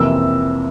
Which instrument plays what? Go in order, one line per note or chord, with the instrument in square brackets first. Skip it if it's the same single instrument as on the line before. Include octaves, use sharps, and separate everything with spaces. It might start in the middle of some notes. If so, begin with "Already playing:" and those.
Already playing: [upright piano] F2 C3 E3 A#3 E6